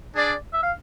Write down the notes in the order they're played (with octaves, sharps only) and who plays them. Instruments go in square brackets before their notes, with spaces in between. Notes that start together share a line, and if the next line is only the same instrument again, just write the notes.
[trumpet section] D4 G#4 D5
[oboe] E5
F5